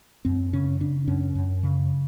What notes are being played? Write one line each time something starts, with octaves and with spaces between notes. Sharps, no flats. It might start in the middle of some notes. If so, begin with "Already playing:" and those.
F#2 C4
C#3 C#4
C#3 D4
F#2 C#4
F#2
C#3